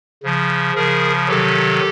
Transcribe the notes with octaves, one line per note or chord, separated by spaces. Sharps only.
C#3 F3
C#3 F3 G#4 A#4
C3 D#3 F#3 G4 A4